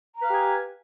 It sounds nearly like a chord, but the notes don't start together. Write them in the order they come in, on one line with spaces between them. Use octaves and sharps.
A#5 B4 F5 G4 G#5